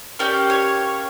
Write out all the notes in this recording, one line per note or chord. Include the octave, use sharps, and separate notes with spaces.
A#3 C#4 G4 D5
C#5